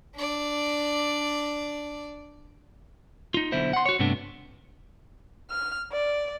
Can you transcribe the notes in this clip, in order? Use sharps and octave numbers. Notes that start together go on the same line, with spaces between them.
D4 D5
D#4 F4
B1 B2 D3 E4 C5
F#5 C6
F#4 C#5
G2 C3 A3 B3 D4
F6
D5